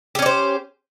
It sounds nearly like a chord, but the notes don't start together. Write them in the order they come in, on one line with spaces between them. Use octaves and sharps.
G4 C#4 D5 C5